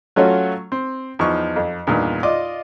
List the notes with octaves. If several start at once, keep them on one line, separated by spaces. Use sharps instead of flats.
F#3 A3 C#4 F4 F#4 C#5
C4
E2 F3 D#4 C#6
F2
E2 G2 A#2 D#3
F4 D5 D#5 D6